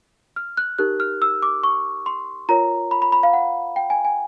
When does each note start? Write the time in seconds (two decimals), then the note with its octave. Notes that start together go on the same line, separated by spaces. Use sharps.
0.36 F6
0.57 F#6
0.78 D#4 G4 A#4 F#6
1.00 F6
1.22 E6
1.42 D6
1.64 C#6
2.06 C6
2.49 F4 A#4 C#5 A#5
2.91 B5
3.02 B5
3.12 B5
3.23 F5
3.33 F#5
3.76 G5
3.90 G#5
4.05 G#5